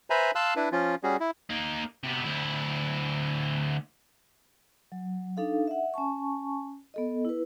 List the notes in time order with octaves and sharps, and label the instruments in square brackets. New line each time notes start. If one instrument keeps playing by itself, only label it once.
[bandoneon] B4 C5 E5 G#5 A#5 B5
F5 A5 C6 E6 F#6
D4 E4 B4
F3 C#4 F4
G3 C#4 F#4 G#4
E4
[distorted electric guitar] A#3 D#4
C3 B3
D2 E4
[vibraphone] F#3
D4 D#4 A4 F5
E5 F#5
C#4 G#5 A5 C#6
B3 A4 D#5
E4 B4